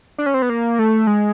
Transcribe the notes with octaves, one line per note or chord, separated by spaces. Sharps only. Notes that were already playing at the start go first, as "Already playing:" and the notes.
D4
C#4
C4
B3
A#3
A3
G#3